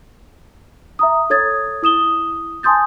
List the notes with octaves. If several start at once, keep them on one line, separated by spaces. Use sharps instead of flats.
E5 A#5 D#6
A4 C#5 D#6 G#6 A6
E4 D#6 E7 G7
G#5 A5 C6 D#6 G6 A6